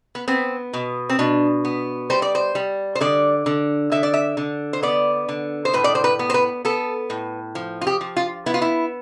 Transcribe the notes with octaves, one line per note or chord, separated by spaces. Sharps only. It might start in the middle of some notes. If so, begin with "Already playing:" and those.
B3
B3 C4
B2
C4
B2 D4
B3
G3 C5
D5
C5
G3
C5
D3 D5
D3
D3 E5
D5
E5
D3
C5
B3 D5
D3
C5
A2 B4
D5
C5
B4
B3
C5
B4
B3 A4
A2
F3
F4
G4
F3
F4
B3 E4
F4
E4